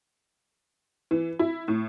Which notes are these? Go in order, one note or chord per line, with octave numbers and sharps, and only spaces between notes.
E3
E4
A2